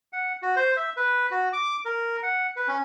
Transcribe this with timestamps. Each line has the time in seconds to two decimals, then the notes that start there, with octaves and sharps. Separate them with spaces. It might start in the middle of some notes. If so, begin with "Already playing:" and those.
0.13 F#5
0.42 F#4
0.56 C5
0.77 E5
0.97 B4
1.31 F#4
1.53 D6
1.85 A#4
2.23 F#5
2.56 B4
2.68 C#4